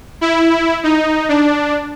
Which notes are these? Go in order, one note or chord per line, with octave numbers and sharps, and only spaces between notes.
E4
D#4
D4